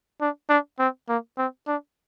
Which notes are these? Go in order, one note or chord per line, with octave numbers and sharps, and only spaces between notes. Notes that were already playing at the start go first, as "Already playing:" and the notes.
D4
D4
C4
A#3
C4
D4